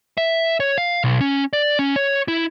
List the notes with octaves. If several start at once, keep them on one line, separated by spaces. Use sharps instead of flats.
E5
C#5
F5
B1
C#4
D5
C#4
C#5
E4